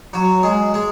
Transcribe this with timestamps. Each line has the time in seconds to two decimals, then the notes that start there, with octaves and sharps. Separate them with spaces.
0.13 F#3 F#4
0.43 G#3 G#4
0.74 G#3 G#4